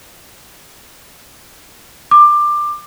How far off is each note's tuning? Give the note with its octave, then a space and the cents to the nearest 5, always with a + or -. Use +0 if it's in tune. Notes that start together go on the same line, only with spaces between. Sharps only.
D6 +20